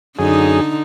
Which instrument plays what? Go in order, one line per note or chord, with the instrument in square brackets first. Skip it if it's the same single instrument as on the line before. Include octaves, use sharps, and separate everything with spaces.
[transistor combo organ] F#2 G#4 [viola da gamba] D3 D#4